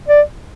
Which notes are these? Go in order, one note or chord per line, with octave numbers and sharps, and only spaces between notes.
D5